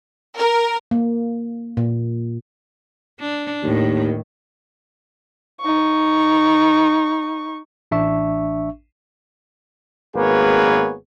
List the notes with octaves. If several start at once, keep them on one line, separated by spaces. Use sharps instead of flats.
A#4
A#3
A#2
D4
D#2 A2 D#3
D#4 C#6
A1 D4 E5 C#6
G#1 A#3 B3 G#4 B4 C#5